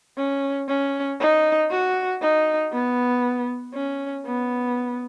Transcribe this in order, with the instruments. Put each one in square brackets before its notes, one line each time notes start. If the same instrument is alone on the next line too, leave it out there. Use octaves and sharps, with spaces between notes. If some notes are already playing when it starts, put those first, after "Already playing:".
[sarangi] C#4
C#4
D#4
F#4
D#4
B3
C#4
B3